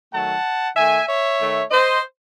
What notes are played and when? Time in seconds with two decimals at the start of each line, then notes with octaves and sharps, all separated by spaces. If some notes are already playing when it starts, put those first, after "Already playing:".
0.13 D#3 F#3 A3 F#5 A5
0.76 D#3 A3 E5 G#5
1.07 C#5 E5
1.39 D#3 A3
1.71 C5 D#5